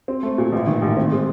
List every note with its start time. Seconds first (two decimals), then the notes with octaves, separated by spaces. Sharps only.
0.08 C4
0.23 A3
0.38 A#2
0.52 A1
0.67 D#3
0.82 A1
0.97 C4
1.12 G#3